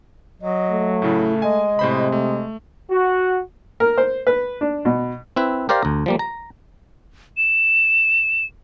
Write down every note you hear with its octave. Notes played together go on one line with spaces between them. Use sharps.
F#3 D#5
A3
A2 C#3 E4
G#3 D#5 G#5
A2 C3 C5 B5
A3
F#4
A#4
C5
B4
D4
B2
C4 E4 B4
G4 A#4 C5 D5 F5
D2 A#5
F3 G3 A#3
A#5
E7